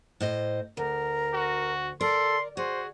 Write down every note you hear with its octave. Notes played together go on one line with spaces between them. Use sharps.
A2 C5 D#5
D2 A#4
F#4
A4 A#4 D5 C6
F#4 G#4 C5